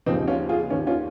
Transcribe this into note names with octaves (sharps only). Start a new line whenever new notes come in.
D#2 C#3 F3 C4 D#4
C#4 F4
F4 G#4
D#2 D#3 C#4
C#4 F4